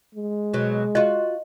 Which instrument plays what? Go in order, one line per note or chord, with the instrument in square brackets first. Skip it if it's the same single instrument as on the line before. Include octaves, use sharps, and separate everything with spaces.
[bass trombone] G#3
[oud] B2 F#3
[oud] F4 F#4 [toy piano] D#5